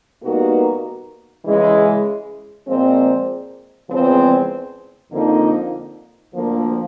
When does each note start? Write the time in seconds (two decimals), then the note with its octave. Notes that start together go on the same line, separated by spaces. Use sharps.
0.22 B2 G3 A#3 D#4 F#4
1.45 C#3 E3 G#3
2.66 A#2 F3 G#3 C4
3.89 E2 C#3 F3 G#3 C4
5.11 F2 D3 F3 A#3 D#4
6.33 D2 D3 F3 A#3